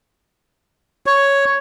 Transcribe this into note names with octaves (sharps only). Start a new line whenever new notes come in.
C#5